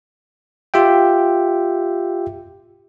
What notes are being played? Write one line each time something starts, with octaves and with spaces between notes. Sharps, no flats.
F4 G4 E5 G5